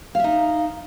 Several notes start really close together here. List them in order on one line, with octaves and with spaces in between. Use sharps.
F5 E5 D#4